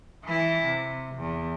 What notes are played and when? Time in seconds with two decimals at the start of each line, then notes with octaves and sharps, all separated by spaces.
0.24 E3 E4
0.67 C3
1.16 E2